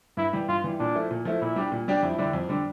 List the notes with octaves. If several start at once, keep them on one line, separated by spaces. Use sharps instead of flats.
G2 E4
E3 G3
G2 F4
E3 G3
A#2 D4
F3 A3 E4
A#2
F3 A3 E4
A#2 E4
G3 D4 G4
A#2
G3 D4 G4
F2 E4
D3 G3 D4
F2
D3 G3 D4